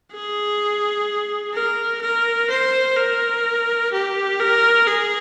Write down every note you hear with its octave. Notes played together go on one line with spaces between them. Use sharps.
G#4
A#4
A#4
C5
A#4
G4
A#4
G#4